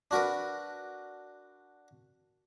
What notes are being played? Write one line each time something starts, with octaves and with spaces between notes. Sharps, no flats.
D4 F#4 A#4 B4